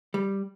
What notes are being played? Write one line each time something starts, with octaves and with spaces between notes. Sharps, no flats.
G3